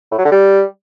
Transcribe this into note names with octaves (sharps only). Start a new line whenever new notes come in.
A2
F#3
D3
G3